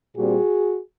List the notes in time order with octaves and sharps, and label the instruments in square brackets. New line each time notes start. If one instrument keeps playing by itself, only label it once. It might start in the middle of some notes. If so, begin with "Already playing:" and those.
[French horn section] A#2 G3 C4 F#4 G#4